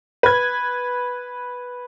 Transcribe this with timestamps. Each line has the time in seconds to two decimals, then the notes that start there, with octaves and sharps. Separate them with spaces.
0.23 B4 G#6